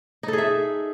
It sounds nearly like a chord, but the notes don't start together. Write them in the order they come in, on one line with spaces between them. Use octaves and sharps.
D#4 A4 G#4 E5